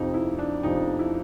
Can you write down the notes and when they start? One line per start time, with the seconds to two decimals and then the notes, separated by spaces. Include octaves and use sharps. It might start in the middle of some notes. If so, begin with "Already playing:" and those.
Already playing: F2 C3 F3 D#4
0.14 E4
0.39 D4
0.63 F2 C3 F3 D#4
0.99 E4